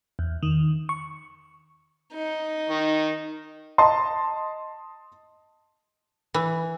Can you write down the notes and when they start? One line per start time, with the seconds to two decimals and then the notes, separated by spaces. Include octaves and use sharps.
0.19 E2
0.43 D#3
0.89 C#6
2.14 D#4
2.70 D#3
3.78 D#5 A5 C6
6.34 E3